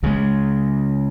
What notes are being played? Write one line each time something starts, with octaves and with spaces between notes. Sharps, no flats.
C#2 C#3 F3 G#3